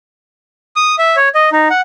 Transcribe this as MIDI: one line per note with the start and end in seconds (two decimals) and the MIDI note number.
0.76 0.95 87
0.98 1.16 76
1.16 1.29 73
1.35 1.49 75
1.52 1.68 63
1.70 1.81 78